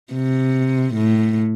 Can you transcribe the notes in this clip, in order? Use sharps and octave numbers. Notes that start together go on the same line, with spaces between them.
C3
A2